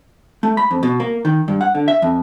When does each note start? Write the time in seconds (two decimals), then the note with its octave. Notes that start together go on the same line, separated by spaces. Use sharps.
0.43 A3
0.57 B5
0.71 F2
0.83 B2
1.00 A#3
1.25 D#3
1.48 G2
1.61 F#5
1.75 D3
1.88 E5
2.02 F2